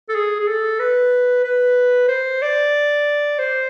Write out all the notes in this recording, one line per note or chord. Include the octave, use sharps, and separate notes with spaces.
A4
G#4
G#4
A4
B4
B4
C5
D5
C5